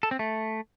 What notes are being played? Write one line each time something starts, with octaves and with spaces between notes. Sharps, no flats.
A4
C4
A3